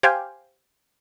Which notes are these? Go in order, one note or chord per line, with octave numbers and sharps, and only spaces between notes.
G4 C5 F5 G5 G#5